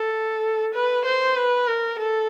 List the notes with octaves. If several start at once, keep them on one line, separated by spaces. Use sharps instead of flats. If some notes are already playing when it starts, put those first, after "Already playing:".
Already playing: A4
B4
C5
B4
A#4
A4